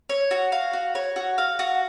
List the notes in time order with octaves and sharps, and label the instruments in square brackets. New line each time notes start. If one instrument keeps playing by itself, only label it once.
[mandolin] C#5
F#4
F5
F#4
C#5
F#4
F5
F#4